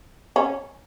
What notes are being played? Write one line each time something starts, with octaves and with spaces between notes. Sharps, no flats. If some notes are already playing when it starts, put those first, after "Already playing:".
C#4